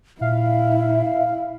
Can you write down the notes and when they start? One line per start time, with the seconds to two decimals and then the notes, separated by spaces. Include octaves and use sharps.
0.21 A#2 E4 E5 F5